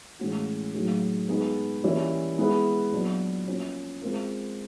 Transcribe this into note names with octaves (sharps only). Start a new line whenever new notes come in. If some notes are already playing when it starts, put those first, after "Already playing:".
A2 E3 G#3 C#4 F#4
A2 F#3 A#3 D#4 G#4
G#3 B3 D#4 G#4 B4
E3 G3 A#3 C#4 E4
G#3 B3 E4 G#4 B4
A#2 F#3 B3 D4
F3 A#3 C#4 F#4
G#3 C4 F4 A#4